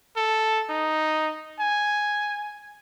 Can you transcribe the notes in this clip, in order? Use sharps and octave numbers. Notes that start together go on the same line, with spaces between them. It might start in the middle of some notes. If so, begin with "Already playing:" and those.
A4
D#4
G#5